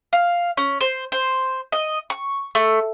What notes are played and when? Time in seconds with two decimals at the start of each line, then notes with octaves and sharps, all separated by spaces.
0.13 F5
0.57 C#4
0.81 C5
1.12 C5
1.72 D#5
2.10 C#6
2.55 A3